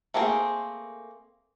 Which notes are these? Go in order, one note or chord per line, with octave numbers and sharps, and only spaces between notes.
A3 A#3 C4 G#4